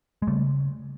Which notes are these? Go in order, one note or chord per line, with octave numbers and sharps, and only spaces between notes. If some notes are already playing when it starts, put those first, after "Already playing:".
G#3
C#3 G3 A3